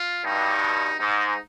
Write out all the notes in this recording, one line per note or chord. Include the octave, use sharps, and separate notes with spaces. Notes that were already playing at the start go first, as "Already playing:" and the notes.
Already playing: F4
G2 B2 D#4
G#2 D#4